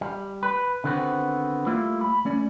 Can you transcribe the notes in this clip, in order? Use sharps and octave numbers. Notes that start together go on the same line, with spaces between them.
G3
B4
D3 D#3 B3 C4 F#4
G3 A3 A#3 E4 F4
B5
A3 C#4 D5